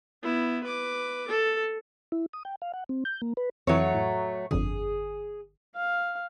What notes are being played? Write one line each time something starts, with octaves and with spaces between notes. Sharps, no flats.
B3 E4
B4 D6
A4
E4
D#6
G5
F5
F#5
C4
G6
A#3
B4
F2 E3 F#3 A3 C#5
A2
G1 F2 D3 G#4
F5